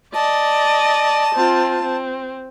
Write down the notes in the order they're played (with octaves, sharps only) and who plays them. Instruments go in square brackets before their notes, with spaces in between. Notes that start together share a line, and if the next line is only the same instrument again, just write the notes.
[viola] D5 D#5 [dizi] A5
[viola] C4 F4
C4